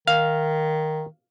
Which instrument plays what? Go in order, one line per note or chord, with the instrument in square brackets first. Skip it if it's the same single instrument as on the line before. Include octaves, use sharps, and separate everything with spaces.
[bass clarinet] D#3 [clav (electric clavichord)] F5